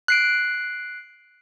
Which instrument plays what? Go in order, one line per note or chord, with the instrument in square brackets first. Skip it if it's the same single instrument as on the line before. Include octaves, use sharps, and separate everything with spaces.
[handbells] F#6 C7 D7